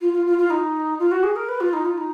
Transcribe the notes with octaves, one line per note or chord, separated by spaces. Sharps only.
F4
F4
F4
F4
D#4
F4
F#4
G#4
A#4
B4
F4
D#4
F4
D#4